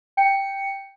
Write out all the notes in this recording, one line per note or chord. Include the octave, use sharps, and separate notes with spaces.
G5 C#7